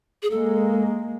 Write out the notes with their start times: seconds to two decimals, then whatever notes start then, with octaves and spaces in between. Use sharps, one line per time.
0.23 G#4
0.30 G#3 A#3 A4